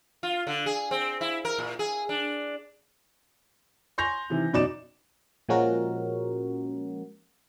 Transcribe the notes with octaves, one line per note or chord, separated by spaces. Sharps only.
F4
D3
G#4
C4
E4
A#4
A#2
G#4
D4
G#5 C6 C#6 G6 A#6 F7
C3 D#3 E3
F#2 B2 D#4 D5 D6 E7
A#2 F3 G#3 C#4 F#4 A#4